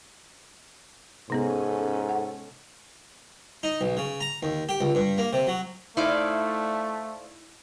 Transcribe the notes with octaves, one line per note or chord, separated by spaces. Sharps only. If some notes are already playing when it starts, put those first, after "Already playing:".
G#2 C3 B3 C#4 G#4 A4
F#5
D#4
B1
C#3
A#5
D#2
G4
C#2
G2
A#3
C3
F#3
A3 D#4 E4 C5 D5 F5